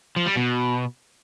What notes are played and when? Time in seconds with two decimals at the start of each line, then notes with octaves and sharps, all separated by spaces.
0.16 F3
0.26 G3
0.36 B2